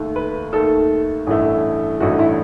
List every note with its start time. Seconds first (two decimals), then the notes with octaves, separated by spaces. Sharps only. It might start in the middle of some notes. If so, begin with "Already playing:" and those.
Already playing: D#2 D#3 A3
0.16 B4
0.53 D#2 D#3 A3 A4
1.27 A1 G2 E3 A3
2.00 A1 G2 E3 A3 F#4
2.19 E4